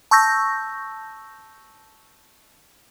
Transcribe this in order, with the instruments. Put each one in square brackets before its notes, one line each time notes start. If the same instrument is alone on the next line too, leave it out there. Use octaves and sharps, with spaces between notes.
[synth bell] A5 C#6 E6 G6 A#6